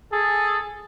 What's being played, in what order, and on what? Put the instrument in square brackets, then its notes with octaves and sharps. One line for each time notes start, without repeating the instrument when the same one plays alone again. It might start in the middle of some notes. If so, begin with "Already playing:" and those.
[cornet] G#4 [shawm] A4